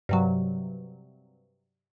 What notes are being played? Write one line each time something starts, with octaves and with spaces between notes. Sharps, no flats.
G2 C3 F#3